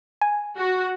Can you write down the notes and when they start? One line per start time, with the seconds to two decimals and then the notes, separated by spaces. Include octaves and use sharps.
0.21 G#5
0.58 F#4